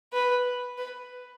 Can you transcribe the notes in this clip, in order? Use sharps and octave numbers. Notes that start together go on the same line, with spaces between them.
B4
B4